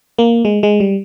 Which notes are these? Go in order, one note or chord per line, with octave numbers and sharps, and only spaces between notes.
A#3
G#3
G#3
G3